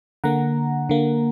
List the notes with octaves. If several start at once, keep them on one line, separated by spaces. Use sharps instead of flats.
D3 A#3 F#5 A#5
D3 A#3